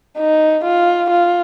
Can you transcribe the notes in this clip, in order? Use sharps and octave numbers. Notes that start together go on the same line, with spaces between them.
D#4
F4
F4